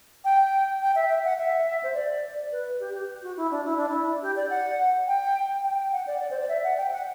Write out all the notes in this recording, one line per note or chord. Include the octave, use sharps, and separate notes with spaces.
G5
G5
E5
E5
F#5
E5
C5
D5
B4
G4
G4
F#4
E4
D4
E4
D4
E4
G4
D5
F#5
G5
G5
G5
F#5
D5
D5
C5
D5
E5
F#5
G5
F#5